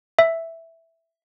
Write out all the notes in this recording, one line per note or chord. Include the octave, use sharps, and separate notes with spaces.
E5